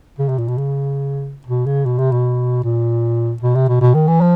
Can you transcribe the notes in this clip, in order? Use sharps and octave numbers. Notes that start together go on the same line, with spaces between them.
C#3
C3
A#2
B2
C#3
B2
C#3
B2
C3
B2
A#2
B2
C3
B2
B2
D#3
E3
F3